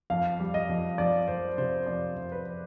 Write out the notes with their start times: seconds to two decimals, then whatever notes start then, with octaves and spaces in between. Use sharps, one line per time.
0.10 F2 F5
0.40 G3
0.54 D#5
0.69 F2
0.98 F2 D5
1.28 F2 C5
1.58 C3 C5
1.87 F2 D5
2.16 F2
2.32 B4